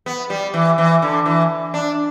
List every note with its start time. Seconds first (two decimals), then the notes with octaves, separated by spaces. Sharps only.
0.06 B3
0.30 G3
0.54 E3
0.78 E3
1.02 D3
1.26 E3
1.74 D4